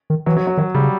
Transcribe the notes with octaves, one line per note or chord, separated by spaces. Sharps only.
D#3
E3 F#3
F#3
F#3
D#3 F#3
C#3 G3